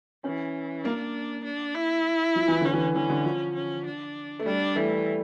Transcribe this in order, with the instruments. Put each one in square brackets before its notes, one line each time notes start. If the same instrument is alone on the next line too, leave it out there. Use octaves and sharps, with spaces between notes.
[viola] E3 [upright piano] C#4
[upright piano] A#3 [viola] D4
[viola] D4
E4
[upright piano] F3
E3
[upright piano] D3 [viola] C#4
[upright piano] E3
[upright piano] E3 [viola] C#4
[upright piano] D3
F3
[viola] C#4
D4
[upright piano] A3
[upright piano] G3 [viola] D4
[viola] E3 [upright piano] A3